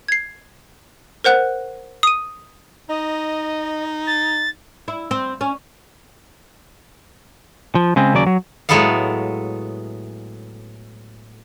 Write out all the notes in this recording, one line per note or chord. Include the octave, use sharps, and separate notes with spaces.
G#6 C7
A#4 C5 F#5 F#6
D#6 D#7
D#4 D#5
A6
E4
C4
C#4
F3
C#3 G#3 C4
D#2 C#3 F#3 D5
F#3
A2 F#3 G#3 B3 A4 F5